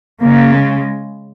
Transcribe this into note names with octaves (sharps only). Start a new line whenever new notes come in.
C#3 A#3
G#3